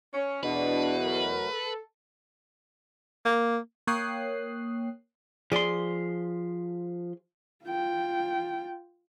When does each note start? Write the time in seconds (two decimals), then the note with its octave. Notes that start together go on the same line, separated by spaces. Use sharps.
0.14 C#4
0.43 E2 B2 D4 B4
1.01 F#3 A3 A#4
1.50 A4
3.25 A#3
3.87 A#3 C#5 G5 D#6 F#6 C7
5.52 F3 G#4 D5 C6
7.64 F4 G5